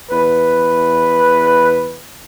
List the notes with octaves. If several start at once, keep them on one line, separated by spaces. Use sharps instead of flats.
E2 B4